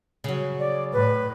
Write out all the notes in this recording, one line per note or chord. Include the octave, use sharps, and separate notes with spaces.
C#3 F#3
D5
A2 B4